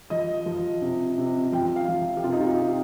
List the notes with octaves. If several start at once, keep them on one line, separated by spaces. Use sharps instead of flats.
F3 D#5
F3
C3
C3
F3 G5
F5
F3
G4
C3 F4
D#4
F4
G4
C3